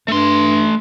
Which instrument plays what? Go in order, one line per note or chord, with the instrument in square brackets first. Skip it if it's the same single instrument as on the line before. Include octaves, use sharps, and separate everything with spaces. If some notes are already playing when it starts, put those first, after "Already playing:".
[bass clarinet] G2 [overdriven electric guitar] A3 C6